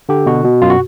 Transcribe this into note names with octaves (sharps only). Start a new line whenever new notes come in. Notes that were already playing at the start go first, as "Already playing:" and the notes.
D3 G4
B2 F#4
B2
F#2 F4
F#4